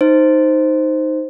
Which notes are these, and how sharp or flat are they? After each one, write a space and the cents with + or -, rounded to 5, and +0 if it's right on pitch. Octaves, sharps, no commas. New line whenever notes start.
D#4 +0 C5 +0